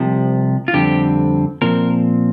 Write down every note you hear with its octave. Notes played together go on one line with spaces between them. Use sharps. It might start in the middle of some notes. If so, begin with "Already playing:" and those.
Already playing: C2 C3 F3
F4
F2 D3 G3 C4 G4
A#2 F3 C4 A#4